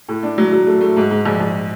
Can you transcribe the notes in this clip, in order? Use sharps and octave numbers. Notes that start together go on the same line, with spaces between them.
A2
D4
F#3
F#3
A3
A3
G#2
G#2
A#1
A#1